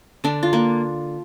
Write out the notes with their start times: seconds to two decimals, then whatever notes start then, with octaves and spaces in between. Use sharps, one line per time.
0.24 D3 D4
0.43 F4
0.53 A#3